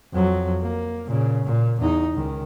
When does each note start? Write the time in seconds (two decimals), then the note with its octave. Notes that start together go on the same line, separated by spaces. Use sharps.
0.13 F2 F#3
0.61 A#3
1.06 A#2 C#3
1.46 A#2
1.81 E2 D#4
2.15 C#2 D#3